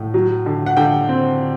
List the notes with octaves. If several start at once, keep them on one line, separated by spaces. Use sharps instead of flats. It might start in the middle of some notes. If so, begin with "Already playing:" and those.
Already playing: A2
F#3
D3
F#5
D3 G5
C4